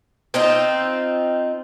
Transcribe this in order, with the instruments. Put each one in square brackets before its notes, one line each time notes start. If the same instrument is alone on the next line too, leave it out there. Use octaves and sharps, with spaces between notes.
[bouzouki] C4 D#4 F4